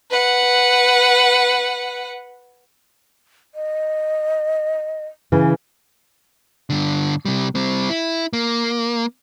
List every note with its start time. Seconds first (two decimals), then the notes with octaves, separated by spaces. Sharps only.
0.11 B4 F#5
3.55 D#5
5.32 C#3 E3
6.70 G2 D3
7.25 C3 G3
7.55 G3 C4
7.89 E4
8.33 A#3